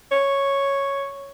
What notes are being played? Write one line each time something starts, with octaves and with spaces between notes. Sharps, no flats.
C#5